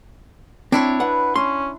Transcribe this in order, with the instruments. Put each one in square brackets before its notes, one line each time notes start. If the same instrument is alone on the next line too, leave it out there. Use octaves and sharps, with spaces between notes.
[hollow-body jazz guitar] C4 [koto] D4 E4 C#5
[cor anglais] B4 [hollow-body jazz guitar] F#5
[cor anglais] C#4 [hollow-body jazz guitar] C6